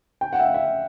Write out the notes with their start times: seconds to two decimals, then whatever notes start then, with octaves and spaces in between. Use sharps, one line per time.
0.21 G5
0.33 F#5
0.39 E5
0.44 F5
0.54 E5